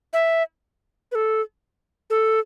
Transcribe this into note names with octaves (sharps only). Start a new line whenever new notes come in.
E5
B4
A4
A4